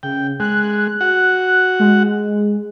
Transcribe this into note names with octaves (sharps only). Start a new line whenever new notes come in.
C#3 G5
G#3 F#6
F#4 F#5
G#3